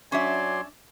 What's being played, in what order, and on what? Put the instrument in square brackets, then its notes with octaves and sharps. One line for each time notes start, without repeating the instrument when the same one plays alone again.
[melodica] F#3 D5 C6 [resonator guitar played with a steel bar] C#4 D4 E5 [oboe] G#5